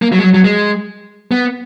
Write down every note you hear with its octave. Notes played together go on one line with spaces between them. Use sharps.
A#3
F#3
G#3
F#3
F#3
G#3
B3